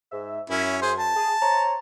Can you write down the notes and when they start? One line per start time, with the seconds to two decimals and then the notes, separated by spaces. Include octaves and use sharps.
0.12 G#2 E5
0.50 F#2 C#4 E4
0.82 G#4 C5
0.99 A5
1.16 G#4
1.42 C5 C#5 A#5